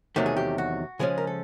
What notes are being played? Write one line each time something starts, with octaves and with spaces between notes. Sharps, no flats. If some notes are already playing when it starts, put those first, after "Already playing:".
E2 C3 D#3 F#3 A3 G4
G#4
G4
F#4
C#3 F3 G#3 C#4 G#4
A#4
A4